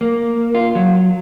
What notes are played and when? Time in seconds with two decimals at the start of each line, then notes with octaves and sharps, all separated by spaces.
0.01 A#3
0.55 F4
0.75 F#3